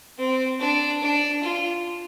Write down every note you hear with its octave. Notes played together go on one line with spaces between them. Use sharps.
C4
D4
D4
F4